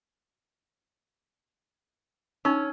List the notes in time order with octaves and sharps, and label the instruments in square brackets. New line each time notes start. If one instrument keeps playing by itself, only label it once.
[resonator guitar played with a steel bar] C#4 [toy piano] D#4 C#6 E6